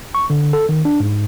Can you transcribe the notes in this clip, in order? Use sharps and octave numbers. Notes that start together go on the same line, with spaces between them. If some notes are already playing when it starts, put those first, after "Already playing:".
C#6
D3
A4
D#3
D4
G#2